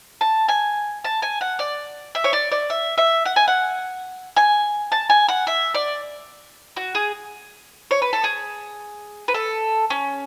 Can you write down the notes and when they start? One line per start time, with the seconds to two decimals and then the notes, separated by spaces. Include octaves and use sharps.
0.21 A5
0.48 G#5
1.04 A5
1.22 G#5
1.41 F#5
1.59 D5
2.15 E5
2.24 C#5
2.33 D5
2.52 D5
2.70 E5
2.98 E5
3.26 F#5
3.36 G#5
3.48 F#5
4.37 G#5
4.92 A5
5.10 G#5
5.28 F#5
5.47 E5
5.74 D5
6.76 F#4
6.95 G#4
7.91 C#5
8.02 B4
8.13 A4
8.24 G#4
9.28 B4
9.34 A4
9.90 C#4